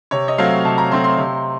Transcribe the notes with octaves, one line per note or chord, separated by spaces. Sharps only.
C3 C#5
D#5
F#3 A3 C4 F5
C3 A5
A#5
F#3 A3 C4 C6
C6
C3